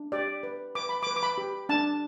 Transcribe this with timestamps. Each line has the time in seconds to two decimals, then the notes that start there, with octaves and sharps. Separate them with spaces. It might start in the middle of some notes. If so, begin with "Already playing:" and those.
Already playing: D4
0.12 G4 D5
0.43 B4
0.75 B4 D6
0.89 B5
1.03 B4 D6
1.16 D6
1.23 B5
1.38 G4
1.69 D4 A5